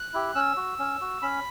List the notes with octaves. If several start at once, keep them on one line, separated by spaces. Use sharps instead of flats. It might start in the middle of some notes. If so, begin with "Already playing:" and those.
Already playing: F#6
E4 G4
C#4 E6
F#4
C#4
F#4
C#4 B5